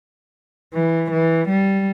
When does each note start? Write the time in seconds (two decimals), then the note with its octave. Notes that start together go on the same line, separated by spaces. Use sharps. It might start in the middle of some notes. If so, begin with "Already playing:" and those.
0.74 E3
1.11 E3
1.48 G3